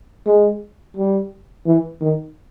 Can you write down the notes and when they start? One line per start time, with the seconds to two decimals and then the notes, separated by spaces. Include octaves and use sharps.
0.27 G#3
0.97 G3
1.66 E3
2.01 D#3